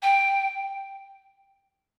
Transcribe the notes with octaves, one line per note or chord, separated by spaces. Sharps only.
G5